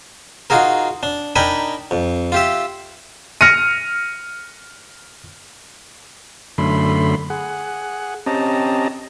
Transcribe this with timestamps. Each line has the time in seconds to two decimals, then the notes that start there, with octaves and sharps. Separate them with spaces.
0.50 D#4 F4 F#4 G#4 A#4
1.03 D4
1.36 D4 D#4 A#4 G5 G#5 B5
1.91 F2
2.32 F4 G4 E5
3.41 F6 A#6 C#7 D#7
6.58 F#2 D3 A3 B5 C6
7.30 G#4 F#5
8.26 C4 C#4 G4 D#5 A5 A#5